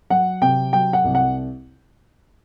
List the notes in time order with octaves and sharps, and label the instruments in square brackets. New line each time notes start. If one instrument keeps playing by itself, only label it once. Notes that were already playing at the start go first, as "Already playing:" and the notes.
[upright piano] F#3 F#5
C3 G5
F#3 G5
F#5
C2
F#5